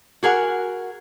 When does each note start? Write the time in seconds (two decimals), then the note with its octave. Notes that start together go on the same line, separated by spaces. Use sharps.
0.23 F#4 G#4 A#4 F#5